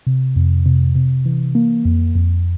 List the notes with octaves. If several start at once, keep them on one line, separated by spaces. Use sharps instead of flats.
C3
F2
C3
C3
E3
A#3
F2
F2